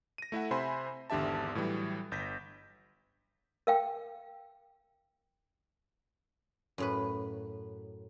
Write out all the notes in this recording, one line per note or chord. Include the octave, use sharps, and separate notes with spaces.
A#6 D#7
A3 E4 E5 F#5
C3 C5 E5 G#5 B5 C6
G#1 E2 D3 G4 E5 A5
A2 E3 F#3 G3
G1 G6 A#6 B6
A#4 F5 G5
F#2 A2 B4